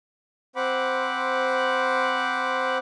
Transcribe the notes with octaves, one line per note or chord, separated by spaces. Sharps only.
C4 C5 F#5 B5 D6